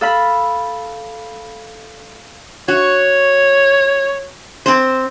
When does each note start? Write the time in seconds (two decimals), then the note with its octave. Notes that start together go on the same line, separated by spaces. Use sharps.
0.01 A4 F5 B5
2.68 F#4 C#5
4.66 C4 C5